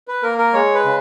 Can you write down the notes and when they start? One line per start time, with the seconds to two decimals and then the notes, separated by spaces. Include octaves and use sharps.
0.08 B4
0.23 A#3 A#4
0.38 A#4
0.54 G#3 C#5
0.75 B4
0.85 C#3